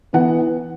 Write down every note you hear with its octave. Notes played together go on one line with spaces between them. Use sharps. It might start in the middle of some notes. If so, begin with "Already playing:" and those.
E3 B3 F#5